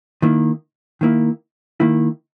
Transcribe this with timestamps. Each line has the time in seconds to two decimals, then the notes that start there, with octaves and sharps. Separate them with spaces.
0.22 D#3 A#3 E4
1.01 D#3 A#3 E4
1.80 D#3 A#3 E4